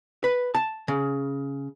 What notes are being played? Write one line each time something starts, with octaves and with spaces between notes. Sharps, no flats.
B4
A5
C#3